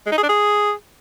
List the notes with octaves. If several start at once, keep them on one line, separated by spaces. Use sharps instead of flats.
G#3
D#4
G#4
D4
G#4